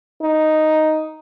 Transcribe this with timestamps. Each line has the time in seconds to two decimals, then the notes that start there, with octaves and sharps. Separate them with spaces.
0.22 D#4